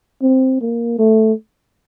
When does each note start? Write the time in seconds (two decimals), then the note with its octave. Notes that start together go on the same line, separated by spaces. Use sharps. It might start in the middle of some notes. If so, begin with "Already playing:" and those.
0.22 C4
0.61 A#3
0.99 A3